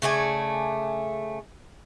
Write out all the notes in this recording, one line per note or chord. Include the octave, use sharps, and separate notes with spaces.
C#3 A3 D5 G#5